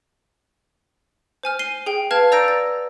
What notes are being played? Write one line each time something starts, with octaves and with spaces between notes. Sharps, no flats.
C5 G#5 F6
C7 D#7 G7
G#4 G5
B4 F5 A5 F6 G#6
D5 A#5 E6 G6 A#6 D7
A6